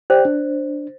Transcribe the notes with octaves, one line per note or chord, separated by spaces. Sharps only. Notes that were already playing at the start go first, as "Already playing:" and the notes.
G4 C5 D5 G5
D4